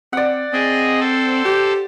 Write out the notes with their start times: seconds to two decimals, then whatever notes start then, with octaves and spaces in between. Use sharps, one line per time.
0.13 C4 D5 F#5
0.53 C4 G#4 D#5
1.01 A4 C5
1.45 G4